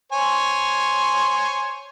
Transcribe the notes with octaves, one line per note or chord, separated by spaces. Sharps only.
C5 C#5 G#5